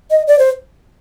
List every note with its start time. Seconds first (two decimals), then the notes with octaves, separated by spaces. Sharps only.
0.11 D#5
0.27 D5
0.39 C5